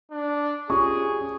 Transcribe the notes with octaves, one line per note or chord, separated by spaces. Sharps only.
D4
C#4 F4 G4 G#4 C#6